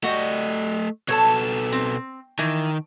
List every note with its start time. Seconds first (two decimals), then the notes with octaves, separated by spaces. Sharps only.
0.04 G3 A3 F#4 D#5
1.08 B2 A4 C#5 A5
1.72 C4
2.39 D#3 E3